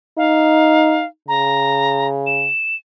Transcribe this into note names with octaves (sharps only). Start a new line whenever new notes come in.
D#4 F5
C#3 A#5
E7